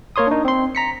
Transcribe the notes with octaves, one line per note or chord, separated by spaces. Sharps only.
A#3 A#4 C#5 C6 D#6
D4 D#4
C4 C6
A#5 B6 C#7